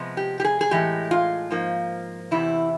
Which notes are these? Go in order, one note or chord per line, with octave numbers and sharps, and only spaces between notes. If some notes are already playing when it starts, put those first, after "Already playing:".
Already playing: C3 F3 G#3 B3
G4
G4
G#4
G#4
A2 E3 G#3 G4
F4
G#2 F3 A#3
E2 C3 E3 E4